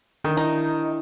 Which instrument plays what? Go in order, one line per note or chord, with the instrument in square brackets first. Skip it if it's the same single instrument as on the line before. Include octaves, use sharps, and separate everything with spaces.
[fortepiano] D#3 [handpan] D4
[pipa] D#4 [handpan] E4